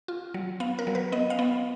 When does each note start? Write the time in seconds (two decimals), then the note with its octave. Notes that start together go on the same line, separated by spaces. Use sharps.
0.08 F4
0.34 F#3
0.60 B3 F5
0.79 A#4
0.87 F#3
0.95 B4
1.12 B3 D#5
1.30 F5
1.39 B3